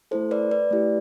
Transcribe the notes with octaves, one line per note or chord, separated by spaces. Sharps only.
A3 E4 A4 C5
B4 D5
B4 D5
A3 E4 G4